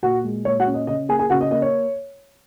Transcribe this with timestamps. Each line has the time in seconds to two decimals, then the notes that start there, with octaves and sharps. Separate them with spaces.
0.03 A#2 F#4 F#5
0.24 G#3
0.45 A#2 C#5
0.60 F#4 F#5
0.66 C#4
0.74 D#5
0.87 C#3 D#5
1.09 A#3 G#4 G#5
1.19 G#4 G#5
1.30 C#3 F#4 F#5
1.41 D#5
1.51 A#3 D#5
1.62 C#5